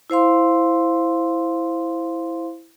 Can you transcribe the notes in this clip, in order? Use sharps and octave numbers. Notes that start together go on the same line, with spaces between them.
E4 C5 F5 C6